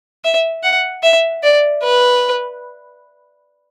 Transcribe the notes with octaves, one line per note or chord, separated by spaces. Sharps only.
E5
F#5
E5
D5
B4